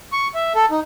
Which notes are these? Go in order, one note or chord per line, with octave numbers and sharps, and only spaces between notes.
C#6
E5
A4
D#4